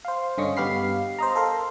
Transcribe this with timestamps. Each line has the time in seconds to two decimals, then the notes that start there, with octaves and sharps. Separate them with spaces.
0.05 C5 F5
0.38 G2 D3 C#4 D#5 C#6
0.57 G2 B3 G4 F5 B5 C7
1.19 C5 D#5 A#5
1.35 A4 A#4 F5 C6